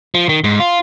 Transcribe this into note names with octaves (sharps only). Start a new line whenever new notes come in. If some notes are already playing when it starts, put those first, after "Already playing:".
F3
D#3
G#2
F4